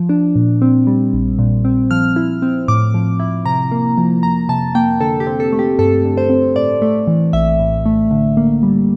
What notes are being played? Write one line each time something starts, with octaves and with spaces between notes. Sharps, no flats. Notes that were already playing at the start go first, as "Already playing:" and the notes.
Already playing: F3
D4
A#2
C4
G3
A#1
A#2
C4
F3 F6
E4
C4
A2 D6
F3
E4
C3 A#5
A#3
F3
F2 A#5
C3 A5
A#3 G5
D3 A4
G4
C4
A4
A3
G4
G2 A4
D3
C5
C4
A2 D5
A3
E3
A#1 E5
A2
A3
D3
A#3
G3